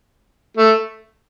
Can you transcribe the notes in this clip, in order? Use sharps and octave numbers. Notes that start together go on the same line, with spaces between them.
A3